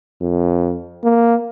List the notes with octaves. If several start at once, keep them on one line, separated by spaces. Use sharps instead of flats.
F2
A#3